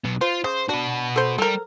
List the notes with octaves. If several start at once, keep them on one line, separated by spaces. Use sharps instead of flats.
B1 B3
F4 C5
C#3 C5
D4 F#4 B4
A4 C5
G3 A4 A#4